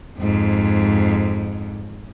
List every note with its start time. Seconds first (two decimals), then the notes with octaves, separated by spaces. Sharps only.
0.19 F2 G#2